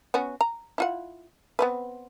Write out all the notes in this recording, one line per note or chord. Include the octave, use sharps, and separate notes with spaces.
B3 C#4 F#4
A#5
E4 F4 F#5
B3 C4 B4